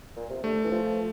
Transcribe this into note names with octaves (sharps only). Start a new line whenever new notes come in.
A#2
C3
D3 A3
E3
F3